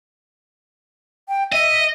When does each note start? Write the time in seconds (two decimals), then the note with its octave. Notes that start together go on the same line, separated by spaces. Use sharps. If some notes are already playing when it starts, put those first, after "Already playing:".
1.29 G5
1.53 D#5 E5